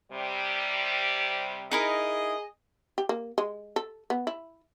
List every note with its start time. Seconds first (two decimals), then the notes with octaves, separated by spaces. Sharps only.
0.11 C3 G3
1.71 D#4 E4 G#4 A#4 D#5
2.98 G4
3.09 A#3
3.38 G#3
3.76 A4
4.10 B3
4.27 E4